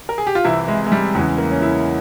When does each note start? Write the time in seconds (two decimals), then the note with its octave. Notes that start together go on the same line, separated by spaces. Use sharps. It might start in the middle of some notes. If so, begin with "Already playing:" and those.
0.09 A#4
0.18 G#4
0.27 G4
0.35 F4
0.44 C2 C3 E3 E4
0.68 G#3
0.87 G#3
0.92 G3
1.15 E2 C#3 E3 G#3
1.38 A#3
1.51 C#4
1.62 E4